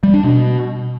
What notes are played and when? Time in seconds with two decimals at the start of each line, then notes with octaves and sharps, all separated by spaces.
0.03 G3
0.14 D4
0.24 B2